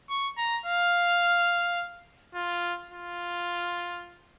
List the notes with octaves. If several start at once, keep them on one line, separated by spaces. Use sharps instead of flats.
C#6
A#5
F5
F4
F4